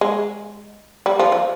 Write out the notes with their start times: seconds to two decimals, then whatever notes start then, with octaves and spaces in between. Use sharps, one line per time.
0.01 G#3
1.06 G3
1.19 F3
1.32 F3